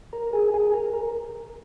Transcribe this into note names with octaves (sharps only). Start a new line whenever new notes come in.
A#4
G#4
G#4
A#4
A#4